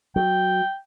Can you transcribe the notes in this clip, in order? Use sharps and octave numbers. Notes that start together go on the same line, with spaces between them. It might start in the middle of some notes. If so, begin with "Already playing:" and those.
F#3 G5